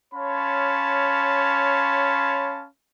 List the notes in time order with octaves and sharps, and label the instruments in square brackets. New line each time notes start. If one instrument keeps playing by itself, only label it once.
[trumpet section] C#4 C#5 F5 A5 B5 C6